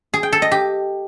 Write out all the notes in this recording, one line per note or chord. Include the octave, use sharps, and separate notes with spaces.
G#4
G5
A4
D#5
G4